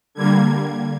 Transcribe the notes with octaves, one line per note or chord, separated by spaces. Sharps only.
D3 G3 A#3 G#6